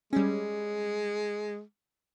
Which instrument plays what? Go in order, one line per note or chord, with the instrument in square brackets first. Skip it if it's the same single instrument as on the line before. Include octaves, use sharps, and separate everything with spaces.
[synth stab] G3 C#4 [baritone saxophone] G#3